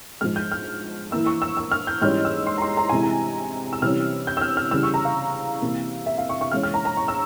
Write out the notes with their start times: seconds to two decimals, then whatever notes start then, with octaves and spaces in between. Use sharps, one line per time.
0.21 G#2 F3 G#3 F6
0.36 G6
0.52 F6
1.11 E3 A#3 E4 E6
1.26 C#6
1.42 E6
1.57 E6
1.72 F6
1.87 G6
2.02 G#2 E3 G3 C#4 F6
2.25 E6
2.47 C6
2.58 A#5
2.62 C6
2.77 A#5
2.89 C3 E3 G#3 E4 G#5
3.03 A#5
3.73 E6
3.82 C3 E3 G3 C#4 F6
4.27 G6
4.37 E6
4.41 F6
4.57 F6
4.71 C#3 E3 G3 E6
4.83 C#6
4.94 A#5
5.05 F5
5.62 C3 E3 A#3
6.06 E5
6.18 F5
6.29 C#6
6.41 C#6
6.51 E3 G#3 C#4 F6
6.63 F6
6.74 A#5
6.85 A#5
6.97 C#6
7.08 E6